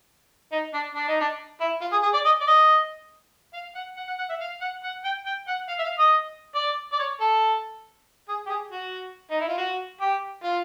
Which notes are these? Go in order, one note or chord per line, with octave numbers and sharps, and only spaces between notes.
D#4
D4
D4
D#4
D4
E4
F4
G#4
G#4
D5
D#5
D5
D#5
F5
F#5
F#5
F#5
F#5
E5
F5
F#5
F#5
G5
G5
F#5
F5
E5
F5
D#5
D5
D5
C#5
A4
G#4
G4
G#4
F#4
D#4
E4
F4
F#4
G4
F4